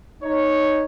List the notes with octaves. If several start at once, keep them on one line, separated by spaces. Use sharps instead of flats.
D#4 C#5